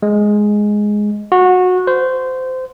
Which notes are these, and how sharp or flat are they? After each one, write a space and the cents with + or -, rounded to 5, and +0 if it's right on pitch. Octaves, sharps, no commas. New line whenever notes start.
G#3 +5
F#4 -20
C5 -20